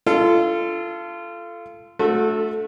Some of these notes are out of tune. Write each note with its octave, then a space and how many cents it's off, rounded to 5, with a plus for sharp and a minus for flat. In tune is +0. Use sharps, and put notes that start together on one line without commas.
F4 -25 A4 +0
A3 -10 F#4 -30 A4 +10